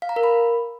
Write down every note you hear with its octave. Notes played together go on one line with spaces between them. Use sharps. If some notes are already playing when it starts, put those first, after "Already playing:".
F5
A#5
A#4
B5